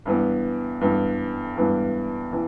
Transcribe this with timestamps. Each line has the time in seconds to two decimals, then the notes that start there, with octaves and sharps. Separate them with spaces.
0.06 G2 E3 B3
0.81 G2 E3 B3
1.57 G2 E3 B3
2.33 E3